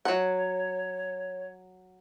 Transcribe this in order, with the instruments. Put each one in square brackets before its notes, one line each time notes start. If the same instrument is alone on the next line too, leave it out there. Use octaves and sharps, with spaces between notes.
[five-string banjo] F#3 F#5 [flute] C#5